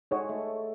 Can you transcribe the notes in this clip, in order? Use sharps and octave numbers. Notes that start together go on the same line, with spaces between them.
G#3 D#4 A4 C#5 F#5
A3